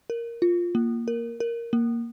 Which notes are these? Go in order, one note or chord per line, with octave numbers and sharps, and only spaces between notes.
A#4
F4
A#3
A#4
A#4
A#3